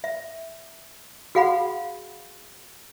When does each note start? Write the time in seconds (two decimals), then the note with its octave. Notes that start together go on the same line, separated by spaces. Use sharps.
0.04 E5
1.35 F#4 G#4 F5 F#5 B5